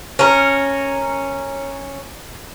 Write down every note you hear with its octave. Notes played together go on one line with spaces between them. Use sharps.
C#4 A#4